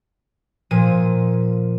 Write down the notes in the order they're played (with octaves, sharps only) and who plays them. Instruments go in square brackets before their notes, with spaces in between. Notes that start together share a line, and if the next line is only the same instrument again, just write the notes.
[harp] A#2 F3 D#7